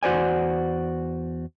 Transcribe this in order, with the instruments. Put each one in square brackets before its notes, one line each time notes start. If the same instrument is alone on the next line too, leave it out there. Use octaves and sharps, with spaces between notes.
[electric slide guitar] E2 F#4 C5 D5 G#5